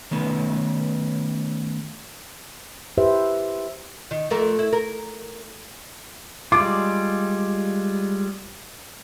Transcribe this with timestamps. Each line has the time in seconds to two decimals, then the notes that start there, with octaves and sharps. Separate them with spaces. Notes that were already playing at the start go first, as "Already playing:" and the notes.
0.11 D#3 A3 B3 C#4 B4
2.97 E4 G4 B4 C5 E5
4.11 D#3
4.30 F2 A3 A#4
4.59 E4
4.73 A#4
6.52 G3 G#3 F4 D6